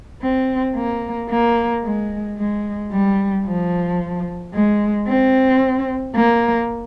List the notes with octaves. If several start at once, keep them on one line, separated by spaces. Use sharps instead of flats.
C4
A#3
A#3
G#3
G#3
G3
F3
G#3
C4
A#3